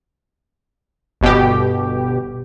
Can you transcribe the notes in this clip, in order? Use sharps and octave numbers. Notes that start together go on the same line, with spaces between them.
G1 B2 G4